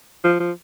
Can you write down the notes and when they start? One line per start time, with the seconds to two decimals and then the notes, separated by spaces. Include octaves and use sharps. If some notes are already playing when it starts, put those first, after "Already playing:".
0.24 F3
0.40 F3